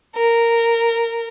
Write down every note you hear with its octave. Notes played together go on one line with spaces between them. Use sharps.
A#4